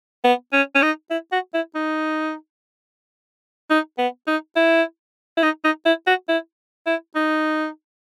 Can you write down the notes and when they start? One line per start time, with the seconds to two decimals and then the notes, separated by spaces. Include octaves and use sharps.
0.24 B3
0.53 C#4
0.75 C#4
0.82 D#4
1.11 E4
1.32 F#4
1.54 E4
1.75 D#4
3.70 D#4
3.98 B3
4.27 D#4
4.56 E4
5.37 E4
5.43 D#4
5.64 D#4
5.86 E4
6.07 F#4
6.29 E4
6.86 E4
7.16 D#4